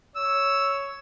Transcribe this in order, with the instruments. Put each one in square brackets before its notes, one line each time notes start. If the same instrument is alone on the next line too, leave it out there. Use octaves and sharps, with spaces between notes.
[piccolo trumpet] C#5 [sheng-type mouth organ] E6